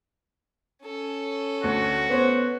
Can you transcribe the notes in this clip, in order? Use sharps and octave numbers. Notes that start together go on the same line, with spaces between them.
C#4 A4
D2 F#4
B3 C5 C#5